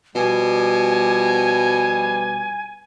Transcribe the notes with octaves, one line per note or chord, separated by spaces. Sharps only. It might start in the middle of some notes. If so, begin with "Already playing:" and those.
B2 F3 G3 G#5